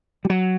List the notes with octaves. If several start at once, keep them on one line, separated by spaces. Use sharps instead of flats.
G3
F#3